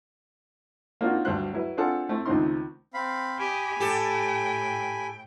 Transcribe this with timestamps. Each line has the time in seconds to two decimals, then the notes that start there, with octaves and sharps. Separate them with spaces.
1.01 A#3 C4 D4 D#4 F4 F#4
1.25 D2 G2 F#3 C5 F#6
1.53 F#3 E4 B4
1.77 C4 D4 F4 G#4 A4 F#5
2.09 A3 C4 E4
2.26 C#2 D#3 A3 C4 D#4 C6
2.94 C4 F5 B5
3.39 G4 D#5 G#5 B5
3.80 A2 G4 A4 G5